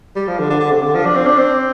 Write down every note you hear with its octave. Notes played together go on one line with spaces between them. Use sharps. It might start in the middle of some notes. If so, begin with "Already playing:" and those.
G3
F3
D3
D3
D3
C3
D3
F3
D4
C4
D4
C4